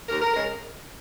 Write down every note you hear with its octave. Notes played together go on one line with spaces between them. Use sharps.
D#2 A#4
A#4
C#3 G#3 A#4